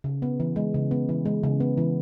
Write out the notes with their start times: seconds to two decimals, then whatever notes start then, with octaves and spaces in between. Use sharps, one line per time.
0.04 C#3
0.22 B3
0.40 E3
0.56 G#3
0.74 C#3
0.91 B3
1.09 E3
1.25 G#3
1.43 C#3
1.60 B3
1.78 E3